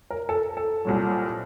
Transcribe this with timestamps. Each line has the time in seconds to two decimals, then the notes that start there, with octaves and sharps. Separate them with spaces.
0.11 A#4
0.29 A4
0.57 A4
0.85 C2 A#2 F#3